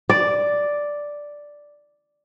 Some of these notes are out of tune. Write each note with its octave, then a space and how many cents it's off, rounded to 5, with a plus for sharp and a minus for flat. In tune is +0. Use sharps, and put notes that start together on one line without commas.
D5 +0